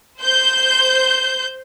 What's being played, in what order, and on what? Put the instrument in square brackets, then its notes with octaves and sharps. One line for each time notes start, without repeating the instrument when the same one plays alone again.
[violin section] C5 G6